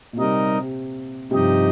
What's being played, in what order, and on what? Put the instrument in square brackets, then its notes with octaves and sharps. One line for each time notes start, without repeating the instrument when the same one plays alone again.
[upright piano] A#2
[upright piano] C3 [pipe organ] G3 D#4 A#4 D#5
[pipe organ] G2 F3 D#4 G4 D#5 [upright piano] C3